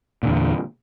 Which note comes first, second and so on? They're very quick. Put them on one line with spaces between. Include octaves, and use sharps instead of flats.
A#2 D3 E2